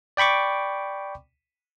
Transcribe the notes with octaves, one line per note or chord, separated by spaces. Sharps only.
D5 G5 B5 C#6 D6